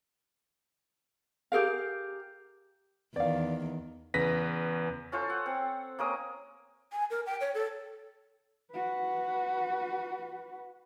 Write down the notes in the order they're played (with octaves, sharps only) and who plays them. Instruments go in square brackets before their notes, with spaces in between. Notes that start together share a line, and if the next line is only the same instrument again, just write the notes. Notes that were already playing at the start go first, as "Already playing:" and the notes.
[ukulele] G4 G#4 A#4 F5
[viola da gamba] E2 D#3 [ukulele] D5 F5
[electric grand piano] E2 C#3 B4 A#6 B6
[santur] C#4 F4 A4 C5
F#5
C4
A#3 C#4 A#4 D#6
[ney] G#5
A#4
G5
C#5
A4
[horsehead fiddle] F#4 B4